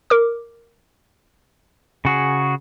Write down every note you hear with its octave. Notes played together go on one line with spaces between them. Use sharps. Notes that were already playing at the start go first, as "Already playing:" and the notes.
A#4 D6
C#3 F#4 G#4